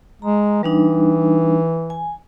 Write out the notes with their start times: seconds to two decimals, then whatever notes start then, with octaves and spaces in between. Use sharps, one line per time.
0.22 G#3 A#5
0.63 E3 G3 D4 D#4
1.90 G#5